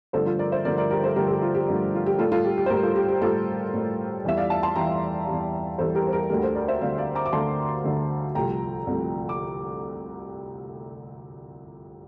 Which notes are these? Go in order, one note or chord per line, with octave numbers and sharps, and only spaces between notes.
G2 D3 F3 A3 A4 C5
F4 A4
A#4 D5
C5 E5
G2 D3 F3 A3 A#4 D5
A#4 D5
G4 A#4
A4 C5
G2 D3 F3 A3 G4 A#4
A4
G4
F4
G4
G2 D3 F3 A3
F4
G4
A2 G3 F4 A4
F4 A4
G4
G4
C5
A2 G3 G4 A#4
F4 A4
G4
G4
A2 G3 F4 A4
A2 G3
E2 E3 G3 E5
D5 F5
F5 A5
A5 C6
E2 E3 G3 G5 A#5
E2 E3 G3
E2 E3 G3 A4 C5
G4 A#4
C5
G4 A#4
D2 D3 A3 G4 A#4
A4 C5
A#4 D5
C5 E5
D2 D3 A3 D5 F5
D5 F5
A#5 D6
D6
D2 D3 A3 A5 C6
D2 D3 A3
C2 C3 F3 A3 G5 A#5
C2 C3 F3 A3
D6